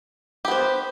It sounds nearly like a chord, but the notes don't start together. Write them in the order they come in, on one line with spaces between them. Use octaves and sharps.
G4 B3 C5